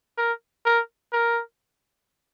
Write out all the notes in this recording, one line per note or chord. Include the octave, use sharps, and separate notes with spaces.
A#4
A#4
A#4